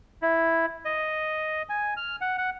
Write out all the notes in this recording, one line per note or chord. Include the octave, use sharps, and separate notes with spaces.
E4
D#5
G#5
F6
F#5
F#5